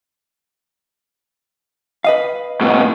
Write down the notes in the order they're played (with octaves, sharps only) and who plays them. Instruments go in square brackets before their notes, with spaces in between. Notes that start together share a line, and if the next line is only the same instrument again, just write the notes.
[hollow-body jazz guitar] B4 D#5 F5
[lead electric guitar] G#2 B2